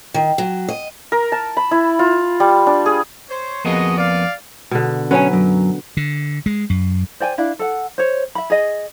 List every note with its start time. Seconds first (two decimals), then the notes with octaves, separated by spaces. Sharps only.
0.14 D#3
0.38 F#3
0.69 D#5
1.12 A#4
1.32 A5
1.57 B5
1.71 E4
1.99 F4
2.40 G3
2.67 D4
2.86 G#4
3.29 C5 C#5
3.65 F2 A#3 B3 F#4 G#4 D#5
3.98 D5 F5
4.71 B2 D3
5.11 F#3 C#4 B4 C#5 G#5
5.33 F#2
5.97 D3
6.46 G#3
6.70 F#2
7.20 C5 D5 G5 G#5
7.38 D4 E4 F5
7.59 A4 F#5
7.98 C5 C#5
8.35 E5 B5
8.50 G#4 D#5